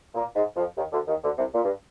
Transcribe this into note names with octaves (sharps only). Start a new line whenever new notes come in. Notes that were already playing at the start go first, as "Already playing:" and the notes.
A#2 A#3
G#2 G#3
F2 F3
D#2 D#3
D2 D3
D#2 D#3
D2 D3
C2 C3
A#2
G2